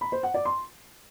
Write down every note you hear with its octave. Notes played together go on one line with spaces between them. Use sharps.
B5
C5
F#5
D5
C6